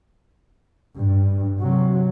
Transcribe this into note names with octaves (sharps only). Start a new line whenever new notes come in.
G2
C3 F#3